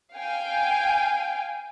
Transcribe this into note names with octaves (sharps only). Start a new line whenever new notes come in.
F5 G5 G#5